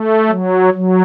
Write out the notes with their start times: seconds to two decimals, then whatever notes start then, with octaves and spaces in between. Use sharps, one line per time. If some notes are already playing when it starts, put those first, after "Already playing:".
Already playing: A3
0.29 F#3
0.74 F#3